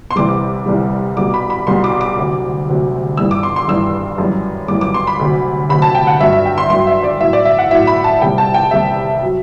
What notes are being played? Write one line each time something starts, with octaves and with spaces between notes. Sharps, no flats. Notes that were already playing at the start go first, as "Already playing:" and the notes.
C6
C2 C3 E3 G3 D6
C2 C3 E3 G3
C2 B2 G3 D6
B5
B5
C2 B2 G3 C6
D6
D6
D2 C3 F#3
D2 C3 F#3
G2 E3 G3 E6
D6
C6
C6
G2 E3 G3 E6
F#2 E3 G3
F#2 E3 G3 D6
D6
C6
B5
D2 C3 F#3
D2 C3 F#3 B5
A5
G5
F#5
G2 F#3 E5
E5
G5
C6
G2 F#3 C6
E5
D5
A2 F#3 E5
D5
E5
F#5
A2 F#3 E5
B5
A5
C2 C3 G3 G5
A5
G5
C2 C3 G3 E5
F#3